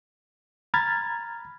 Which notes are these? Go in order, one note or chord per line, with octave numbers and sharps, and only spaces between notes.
A#5 B5 F6 G#6 A6